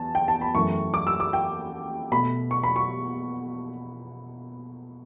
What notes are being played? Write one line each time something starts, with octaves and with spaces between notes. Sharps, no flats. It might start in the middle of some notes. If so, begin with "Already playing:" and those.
Already playing: E2 A5
G5
A5
B5
F#2 E3 A3 C#6
D6
E6
D6
G5
B2 A3 B5
C#6
B5
C#6